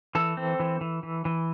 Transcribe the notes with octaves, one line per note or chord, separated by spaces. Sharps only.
E3 A4
C4
E3
E3
E3
E3